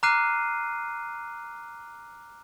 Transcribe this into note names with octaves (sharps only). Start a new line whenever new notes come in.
A#5 D6 F6 F#6 C7 D#7